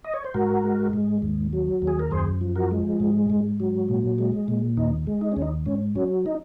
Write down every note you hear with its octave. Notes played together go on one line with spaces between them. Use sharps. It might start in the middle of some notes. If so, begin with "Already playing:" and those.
D#5
C#5
C5
G#2 F#4 A#4
G#3
G#2
D#2
F#3
D#2
G#4
A#4
F#2 G#4 C5
F3
F#4 A#4
G#3
G#2
G#2
F#3
A#2
G#3
A#2
D#2 D#4
G#3
D#4
D#2 C#4
D#4
G#2 C#4
F#3 C#4
D#4